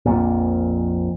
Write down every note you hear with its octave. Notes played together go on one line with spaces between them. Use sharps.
A#1 F2 A#2